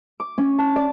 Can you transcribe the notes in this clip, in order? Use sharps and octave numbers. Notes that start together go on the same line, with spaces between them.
D6
C#4
A5
D5